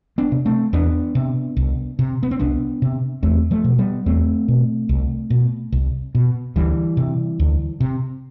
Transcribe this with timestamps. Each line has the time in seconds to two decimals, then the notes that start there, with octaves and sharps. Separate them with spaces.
0.18 B3 D4
0.32 C3
0.46 A3 C4
0.73 E2 B3 D4
1.15 C3
1.57 C2
1.99 C3
2.23 B3
2.31 C4
2.39 C2 B3 D4
2.82 C3
3.23 E2 A3 C4
3.51 F3 A3
3.64 B2
3.79 G3 B3
4.06 E2 A3 C4
4.48 B2
4.89 C2
5.30 B2
5.72 C2
6.15 B2
6.56 D2 E3 G3
6.97 C3
7.40 D2
7.80 C3